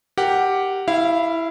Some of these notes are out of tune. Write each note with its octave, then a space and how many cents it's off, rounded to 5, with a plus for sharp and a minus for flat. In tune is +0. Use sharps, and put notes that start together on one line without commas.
G4 +0 A#4 -10 F#5 +10
E4 +0 F5 -30